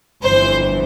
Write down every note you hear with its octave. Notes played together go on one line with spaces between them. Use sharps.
G1 F2 E3 C5